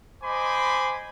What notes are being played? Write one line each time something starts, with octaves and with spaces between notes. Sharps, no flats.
C5 D#5 G#5 B5 C6 D6